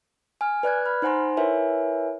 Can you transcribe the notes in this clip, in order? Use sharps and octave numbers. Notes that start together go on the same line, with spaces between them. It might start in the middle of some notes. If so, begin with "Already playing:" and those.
G#5 F6
B4 D5 F#6 G#6
B5 F6
D#4 C5 F#5 G#5 A#5 C6
E4 A#4 B4 C#5 E5 G#5